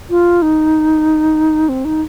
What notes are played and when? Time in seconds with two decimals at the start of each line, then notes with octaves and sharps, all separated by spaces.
0.10 F4
0.42 D#4
1.69 C4
1.85 D#4